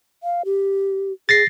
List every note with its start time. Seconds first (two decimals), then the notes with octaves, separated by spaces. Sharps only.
0.23 F5
0.45 G4
1.29 G#4 A6 A#6 C7